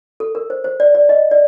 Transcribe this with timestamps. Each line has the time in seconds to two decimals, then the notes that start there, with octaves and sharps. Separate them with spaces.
0.20 A4
0.35 A#4
0.50 C5
0.64 C5
0.80 D5
0.95 D5
1.09 D#5
1.31 D5